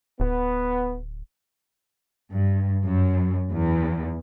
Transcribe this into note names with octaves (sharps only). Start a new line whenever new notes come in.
D1 B3
G2
F#2
E2